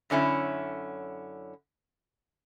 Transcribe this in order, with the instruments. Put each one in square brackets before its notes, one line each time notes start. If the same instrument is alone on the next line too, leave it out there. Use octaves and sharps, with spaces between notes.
[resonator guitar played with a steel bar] F#2 D3 C#4 E4